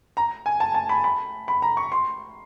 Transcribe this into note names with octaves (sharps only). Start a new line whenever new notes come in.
A#5
G#5
A5
A5
B5
B5
B5
A#5
C#6
C6